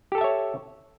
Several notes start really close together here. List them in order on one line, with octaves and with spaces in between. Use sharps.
G4 A4 A5 E5 C#5